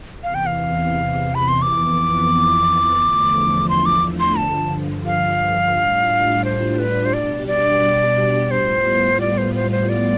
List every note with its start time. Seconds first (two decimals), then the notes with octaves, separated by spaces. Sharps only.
0.23 E2 C3 E3 F5
0.35 G5
0.46 F5
1.35 B5
1.48 C6
1.62 F2 E3 B3 D6
3.00 E2 D3 F3 A3
3.69 C6
3.86 D6
4.20 C6
4.38 G2 D3 F3 A5
5.06 F5
5.76 A2 G3 D4 F4
6.44 C5
6.78 B4
7.05 C5
7.14 B2 G3 D4 G4 D5
7.47 D5
8.51 A2 G3 B3 F4 C5
9.21 D5
9.38 C5
9.55 C5
9.71 C5
9.89 D5